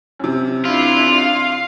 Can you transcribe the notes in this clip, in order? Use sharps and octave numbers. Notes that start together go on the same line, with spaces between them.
F#2 C3
D4 E4 F4
F5